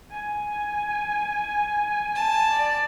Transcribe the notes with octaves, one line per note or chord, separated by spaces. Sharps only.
G#5
A5
D5